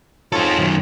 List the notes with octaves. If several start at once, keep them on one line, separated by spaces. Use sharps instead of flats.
G#2 C4 F4 A4 C#5
F#2 D#3